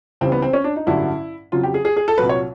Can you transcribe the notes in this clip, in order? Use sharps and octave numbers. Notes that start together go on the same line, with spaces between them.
C#2 C#3 E3 G3 C4
B3
C4
C#4
D4
D#4
A1 G2 D3 F#3 E4
F2 C#3 F#3 F4
G4
G#4
G#4
G#4
A4
C2 A#2 F#3 B4
C#5